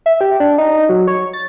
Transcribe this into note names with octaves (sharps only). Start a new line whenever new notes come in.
E5
G4
D4
D#4
F#3
C#5
A6